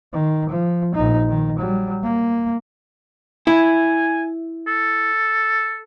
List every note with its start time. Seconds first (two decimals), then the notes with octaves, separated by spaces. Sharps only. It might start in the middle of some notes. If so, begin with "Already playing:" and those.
0.13 D#3
0.49 F3
0.95 A#1 D#4
1.29 D#3
1.59 F#3 G3
2.03 A#3
3.47 E4 G#5
4.67 A4